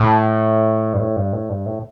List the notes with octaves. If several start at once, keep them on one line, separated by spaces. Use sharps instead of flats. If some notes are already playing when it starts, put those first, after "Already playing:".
Already playing: A2
G2
A2
G2
A2
G2
A2